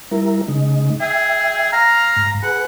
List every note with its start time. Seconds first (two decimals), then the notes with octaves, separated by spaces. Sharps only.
0.11 G3 E4 A#4
0.48 C#3 G#3 D#4
1.00 G#4 E5 G5
1.73 F5 A#5
2.17 G#2
2.43 G#4 B4 F#5